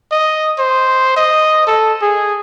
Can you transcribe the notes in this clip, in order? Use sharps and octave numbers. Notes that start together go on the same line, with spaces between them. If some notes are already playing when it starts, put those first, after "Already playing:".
D#5
C5
D#5
A4
G#4